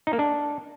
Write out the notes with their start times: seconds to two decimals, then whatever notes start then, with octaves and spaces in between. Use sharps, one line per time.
0.07 D#4
0.13 A#3
0.19 D4